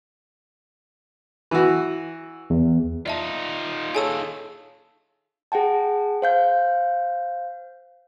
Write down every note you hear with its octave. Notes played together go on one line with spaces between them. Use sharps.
E3 F#4
E2
D#4 F4 D5 E5 A5
G#4 A4 C#5 G#5 A5 E6
G#4 F#5 G5 A5
C5 F5 G6